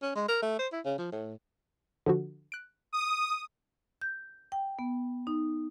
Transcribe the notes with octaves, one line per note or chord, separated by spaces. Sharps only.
C#4
G#3
A#4
A3
C5
E4
C#3
F3
A2
D3 F3 F#4
F#6 D7
D#6
G6
G5
B3
D#4